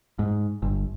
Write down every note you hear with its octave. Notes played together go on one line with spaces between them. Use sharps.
G#2
G1